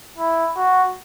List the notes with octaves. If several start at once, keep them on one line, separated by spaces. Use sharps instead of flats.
E4
F#4